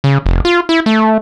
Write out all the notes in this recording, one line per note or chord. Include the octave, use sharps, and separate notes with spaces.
C#3
F1
F4
E4
A3